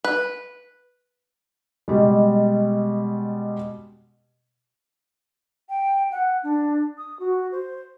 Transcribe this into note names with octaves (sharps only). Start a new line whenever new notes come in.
B4
B2 G3 G#3
G5
F#5
D4
D#6
F#4
C5